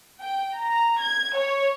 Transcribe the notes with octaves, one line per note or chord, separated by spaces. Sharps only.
G5
A#5
G#6
C#5